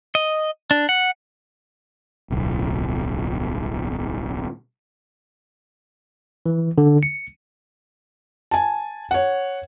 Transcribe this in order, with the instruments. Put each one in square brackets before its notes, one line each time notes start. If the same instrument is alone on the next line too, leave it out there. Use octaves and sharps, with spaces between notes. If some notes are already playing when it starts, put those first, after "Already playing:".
[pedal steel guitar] D#5
D4
F#5
[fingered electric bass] D1 B1
[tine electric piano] E3
D3
C#7
[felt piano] G#5 A5
C#5 F#5